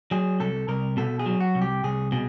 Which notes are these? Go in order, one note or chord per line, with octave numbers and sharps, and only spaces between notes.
F#3 G#4
C2 A4
C2 A#4
B2 A4
G#4
F#3
F#4
C2
G4
C2 G#4
B2 G#4